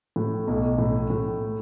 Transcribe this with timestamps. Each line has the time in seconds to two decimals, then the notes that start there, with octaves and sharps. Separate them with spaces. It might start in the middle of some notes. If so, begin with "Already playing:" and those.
0.16 A2
0.47 B1
0.78 A2
1.10 A2